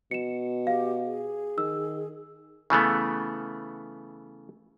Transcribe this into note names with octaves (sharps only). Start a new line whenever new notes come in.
B2 C#7 E7
G4 F5
G#4
D#3 E6
C#3 E3 A3 B3